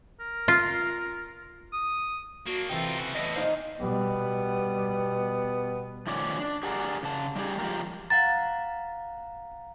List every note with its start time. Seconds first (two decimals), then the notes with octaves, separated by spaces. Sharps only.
0.20 A#4
0.48 F4
1.73 D#6
2.47 A#3 D4 F#4
2.70 C3 E3 D#4 F4 A4 G5
2.98 C#3 F#4
3.15 E2 A2 B4 D#5 E5 A5
3.36 A#2 D#3 D#4 C5 F5
3.80 B2 G3 B3
6.07 D#3 F3 A3 C#4 D5
6.40 D4
6.63 G4 G#4 A#4 D5 F#5
7.03 C#3 A5
7.36 G3 D#4 G4 G#4
7.59 F3 G#3 G4 A#4
8.10 F5 F#5 A#5 A6